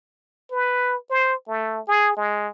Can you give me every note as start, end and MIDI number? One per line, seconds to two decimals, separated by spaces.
0.52 0.96 71
1.10 1.34 72
1.48 1.81 57
1.88 2.13 68
2.17 2.49 56